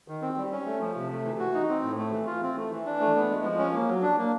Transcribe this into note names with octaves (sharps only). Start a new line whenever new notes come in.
D#3
C4
G3
C#4
A3
F3
C3
A3
E3
F#4
D#4
C4
A2
A3
E3
F4
C4
A3
E3
D4
A3
B3
G#3
F3
C#4
A#3
F#3
D4
A#3